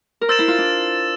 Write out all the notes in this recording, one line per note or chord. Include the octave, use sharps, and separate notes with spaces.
A#4
C5 E6 A6 E7
E4
F4
D4